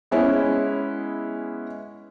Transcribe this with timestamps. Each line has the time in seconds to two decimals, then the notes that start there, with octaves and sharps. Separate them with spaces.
0.11 G#3 B3 C#4 E4